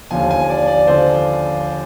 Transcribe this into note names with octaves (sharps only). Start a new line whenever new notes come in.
D#2 D3 F3 G#5
G#5
D5
D5
D3 F3 C5